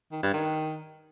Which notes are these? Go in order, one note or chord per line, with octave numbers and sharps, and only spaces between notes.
D#3
G2
D#3